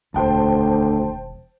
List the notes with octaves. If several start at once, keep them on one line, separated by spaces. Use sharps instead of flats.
E1 D2 D#3 C5 G5 A5